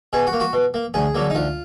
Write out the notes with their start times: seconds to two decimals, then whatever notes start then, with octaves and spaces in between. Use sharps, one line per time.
0.13 B2 G#4
0.27 F#4
0.33 A#3
0.40 F#4
0.53 B2
0.74 A#3
0.94 D2 G#4
1.15 D3 F#3 A#3
1.30 D#4
1.35 D2 F4